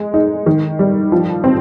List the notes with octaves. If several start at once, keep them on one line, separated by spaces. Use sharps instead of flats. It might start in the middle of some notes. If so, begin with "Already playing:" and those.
Already playing: G#3
D#4
D#3
G3
F3
C4